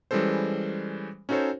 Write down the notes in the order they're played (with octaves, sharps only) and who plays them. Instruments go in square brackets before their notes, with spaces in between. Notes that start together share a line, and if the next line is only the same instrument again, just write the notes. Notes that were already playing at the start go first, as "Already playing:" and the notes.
[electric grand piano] E3 G3 G#3 C#4 A4 C5
C#4 D#4 F#4 A4 C5 C#5